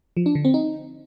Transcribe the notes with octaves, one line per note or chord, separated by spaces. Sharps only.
F3
D4
D3
C4
D#4